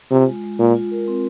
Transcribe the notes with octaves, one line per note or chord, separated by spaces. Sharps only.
C3 F4
G#3
G#3
A#2 F4
F4
A#4
C4